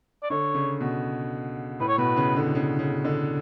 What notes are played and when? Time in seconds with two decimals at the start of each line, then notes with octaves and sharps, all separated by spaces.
0.23 D5
0.30 D3 C#5
0.55 C#3
0.81 B2
1.80 A2 B4
1.88 C#5
1.98 B2 B4
2.17 C#3
2.36 D3
2.55 C#3
2.79 C#3
3.05 D3